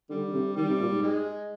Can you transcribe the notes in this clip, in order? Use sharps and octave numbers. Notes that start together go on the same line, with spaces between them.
D3 G3
D3
C3
D#3 G3
C3
A#2
G#2
G#3